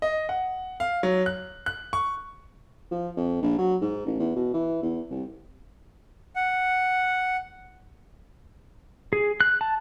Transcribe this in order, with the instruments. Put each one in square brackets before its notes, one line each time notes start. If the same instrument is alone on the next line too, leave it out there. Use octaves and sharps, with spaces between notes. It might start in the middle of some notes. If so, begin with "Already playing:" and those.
[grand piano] D#5
F#5
F5
F#3
F#6
F#6
C#6
[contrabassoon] F3
F2
A#1
F#3
G#2
A1
E2
B2
E3
E2
C2
[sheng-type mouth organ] F#5
[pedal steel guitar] G#4
F#6
A5